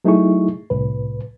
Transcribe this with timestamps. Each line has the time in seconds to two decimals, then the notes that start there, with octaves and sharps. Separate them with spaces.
0.04 F#3 A3 D#4 E4 G#4 C#6
0.70 C2 A2 B4